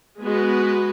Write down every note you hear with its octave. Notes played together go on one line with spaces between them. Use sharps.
G#3 B3 F#4 B4